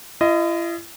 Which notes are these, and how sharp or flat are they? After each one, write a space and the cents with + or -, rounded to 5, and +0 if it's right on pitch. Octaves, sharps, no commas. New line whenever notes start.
E4 +45 D#5 +0